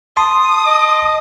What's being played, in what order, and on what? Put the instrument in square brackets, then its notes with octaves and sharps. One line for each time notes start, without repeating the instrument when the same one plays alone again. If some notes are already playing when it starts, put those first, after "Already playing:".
[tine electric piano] A5 C6 [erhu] D#6
[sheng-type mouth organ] D#5